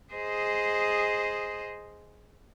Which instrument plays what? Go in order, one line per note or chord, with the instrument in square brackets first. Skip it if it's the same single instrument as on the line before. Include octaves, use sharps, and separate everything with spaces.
[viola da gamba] G#4 C5 D#5